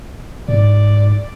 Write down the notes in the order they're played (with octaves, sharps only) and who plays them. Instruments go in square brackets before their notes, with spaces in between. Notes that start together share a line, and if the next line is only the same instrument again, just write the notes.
[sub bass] G#2 [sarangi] D5